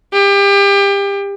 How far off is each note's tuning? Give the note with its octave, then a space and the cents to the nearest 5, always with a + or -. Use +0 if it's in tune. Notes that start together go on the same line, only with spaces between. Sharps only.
G4 +30